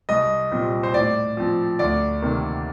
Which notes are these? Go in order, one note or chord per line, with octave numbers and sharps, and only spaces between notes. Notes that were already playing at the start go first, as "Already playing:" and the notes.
C2 D#5
A#2 G3 C4
C5
A2 D5
F3 C4
D2 D5
C3 D#3 A#3